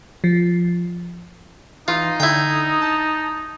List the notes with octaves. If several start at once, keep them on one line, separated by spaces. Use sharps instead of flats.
F3
E3 D#4 F4
D3 E4 G5
A5